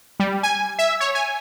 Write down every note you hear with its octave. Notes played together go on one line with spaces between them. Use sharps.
G3
G#5
E5
C#5
G#5